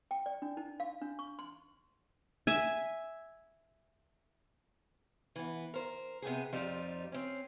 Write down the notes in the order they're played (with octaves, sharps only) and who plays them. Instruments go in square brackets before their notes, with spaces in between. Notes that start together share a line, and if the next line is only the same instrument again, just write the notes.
[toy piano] G5
D5
D4
D#4
F5
D4
C#6
C6
[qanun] E5 G#5
[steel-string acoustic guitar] E3 B3
A#4 C5
C3 B3 G4 G#4
F2 F3 G3 D#4 G4
C4 C#4